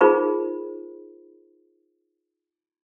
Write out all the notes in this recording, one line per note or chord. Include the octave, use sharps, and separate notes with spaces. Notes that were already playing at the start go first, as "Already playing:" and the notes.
D#4 F4 G#4 A#4 C5 B5